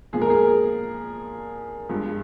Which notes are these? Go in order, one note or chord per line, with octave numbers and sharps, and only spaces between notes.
A#2 F3 G#3 G#4
A#4
G#4
G2 F3 G#3